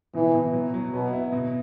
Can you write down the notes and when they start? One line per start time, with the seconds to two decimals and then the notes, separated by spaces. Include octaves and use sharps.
0.14 B2 E3
0.34 B2
0.53 F#3
0.74 F#3
0.93 B2 B3
1.13 E4
1.32 B2